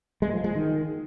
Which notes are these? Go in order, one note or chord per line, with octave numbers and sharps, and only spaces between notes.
G#3
F3
G#3
D#3